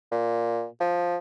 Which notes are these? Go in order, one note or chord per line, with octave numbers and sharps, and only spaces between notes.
A#2
F3